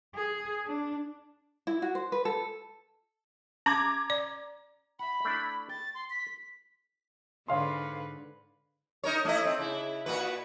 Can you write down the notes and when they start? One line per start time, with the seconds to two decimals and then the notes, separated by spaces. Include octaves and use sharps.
0.15 G#4
0.66 D4
1.67 E4
1.82 F#4
1.95 C5
2.12 B4
2.25 A4
3.66 C#4 A#5 D6 G#6
4.10 D5
4.99 E5 F#5 B5
5.25 A3 D4 E4
5.69 G5 A6
5.94 C6
6.10 B6
7.48 G#2 D3 B4 C#5 F5 C6
9.04 D#4 A#4 C#5
9.25 A3 E4 D#5
9.45 C4
9.59 C#3 E4
10.06 A#2 F#4 B4